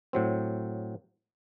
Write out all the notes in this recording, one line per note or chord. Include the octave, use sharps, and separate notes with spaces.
A2 F#3 C4